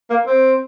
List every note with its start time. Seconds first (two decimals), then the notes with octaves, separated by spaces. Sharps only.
0.10 A#3
0.27 C4